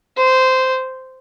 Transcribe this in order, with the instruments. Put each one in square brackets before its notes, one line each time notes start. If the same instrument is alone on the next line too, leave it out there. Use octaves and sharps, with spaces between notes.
[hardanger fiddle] C5